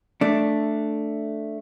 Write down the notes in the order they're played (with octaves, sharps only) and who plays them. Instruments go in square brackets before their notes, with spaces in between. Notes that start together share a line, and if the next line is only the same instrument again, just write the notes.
[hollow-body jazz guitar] A3 D4